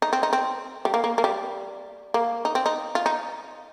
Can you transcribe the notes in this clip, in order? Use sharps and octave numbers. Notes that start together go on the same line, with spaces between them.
D#4
C4
D#4
C4
G3
A#3
A#3
A#3
G3
A#3
D#4
C4
D#4
F4
D#4